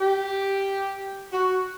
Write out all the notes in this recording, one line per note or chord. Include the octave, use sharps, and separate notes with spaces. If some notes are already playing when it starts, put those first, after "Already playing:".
G4
F#4